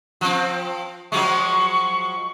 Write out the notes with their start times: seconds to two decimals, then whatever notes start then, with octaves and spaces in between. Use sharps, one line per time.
0.21 F3 C4
1.12 F3 F#3 G#3 C#6